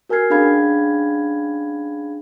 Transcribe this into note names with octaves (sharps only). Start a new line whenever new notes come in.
F#4 A#4 G#5 F6 G#6 C7
C#4 D4 G#4 F5 B5 G#6